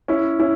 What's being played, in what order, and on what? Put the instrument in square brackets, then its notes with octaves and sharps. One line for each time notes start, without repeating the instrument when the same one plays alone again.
[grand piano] C#4 E4
C#4 E4